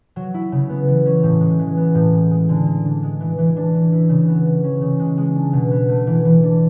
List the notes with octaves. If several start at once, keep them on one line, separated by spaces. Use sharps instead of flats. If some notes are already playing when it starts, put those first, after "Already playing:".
F#3
E4
C#3
B3
E3
C#4
A2
G#3
E3
B3
A2
G#3
G#3
D3
D3
D4
G#3
E3
E3
D4
E3
E4
C#3
B3
E3
C#4
C#3
G#3
G#3
D4
B2
B3
A3
E3
E3
D4